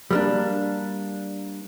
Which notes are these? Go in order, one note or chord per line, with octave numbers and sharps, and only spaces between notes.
G3 A#3 D4